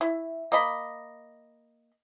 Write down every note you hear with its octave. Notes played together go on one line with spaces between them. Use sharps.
E4
A#3 D#5 B5